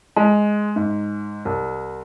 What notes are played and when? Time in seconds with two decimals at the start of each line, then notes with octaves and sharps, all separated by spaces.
0.16 G#3
0.76 G#2
1.45 C2